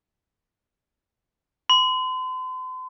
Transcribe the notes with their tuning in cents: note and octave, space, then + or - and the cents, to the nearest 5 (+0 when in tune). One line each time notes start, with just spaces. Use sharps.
C6 -40